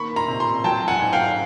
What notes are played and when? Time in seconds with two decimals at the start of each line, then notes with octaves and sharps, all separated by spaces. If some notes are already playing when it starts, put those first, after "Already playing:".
Already playing: D#3 A#3 B5 C#6
0.16 A#5 C6
0.28 C3
0.40 A#5 C6
0.64 F#3 G5 A5
0.88 F#5 G#5
1.01 G#2
1.13 F5 G5